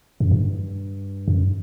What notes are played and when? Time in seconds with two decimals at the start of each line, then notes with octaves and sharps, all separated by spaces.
0.20 F#2
0.31 G2
1.28 F#2